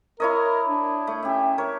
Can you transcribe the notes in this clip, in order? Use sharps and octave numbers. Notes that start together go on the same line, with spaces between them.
E4 A#4 C#5 D#5
D4
A3
C#4 G4 E5
A#4 C#5